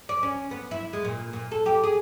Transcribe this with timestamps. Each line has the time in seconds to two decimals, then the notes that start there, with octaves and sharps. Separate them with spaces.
0.09 D5
0.23 C#4
0.51 B3
0.71 E4
0.93 G#3
1.05 A#2
1.33 A#2
1.52 A4
1.66 G4
1.83 G#4